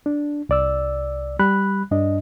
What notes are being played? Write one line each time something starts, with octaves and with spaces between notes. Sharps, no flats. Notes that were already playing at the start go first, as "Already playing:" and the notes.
D4
C2 D5 E6
G3 B5 F#6
G2 D4 D#5